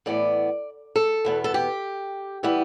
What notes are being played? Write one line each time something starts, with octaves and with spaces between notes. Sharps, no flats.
A2 E3 B3 D5
A4
E2 B2 B3
A4
G4
E3 G3 B3